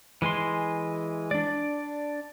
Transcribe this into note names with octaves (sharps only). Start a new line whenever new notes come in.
E3 G#3 G#5 C6
D4 D5